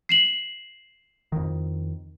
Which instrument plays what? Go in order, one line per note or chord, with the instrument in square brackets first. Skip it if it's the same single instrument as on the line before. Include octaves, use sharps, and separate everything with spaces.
[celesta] C7 E7 F#7
[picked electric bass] F2 D#3